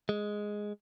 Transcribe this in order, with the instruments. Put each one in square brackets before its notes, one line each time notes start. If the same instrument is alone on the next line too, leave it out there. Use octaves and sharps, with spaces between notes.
[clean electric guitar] G#3